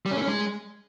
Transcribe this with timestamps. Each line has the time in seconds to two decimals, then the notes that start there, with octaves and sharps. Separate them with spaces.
0.06 G3
0.11 C#4
0.17 A3
0.22 C#4
0.27 G#3